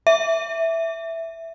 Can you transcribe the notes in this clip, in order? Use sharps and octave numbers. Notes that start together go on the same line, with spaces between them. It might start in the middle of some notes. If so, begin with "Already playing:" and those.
E5